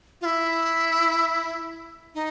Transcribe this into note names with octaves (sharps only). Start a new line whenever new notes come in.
F4
E4
D#4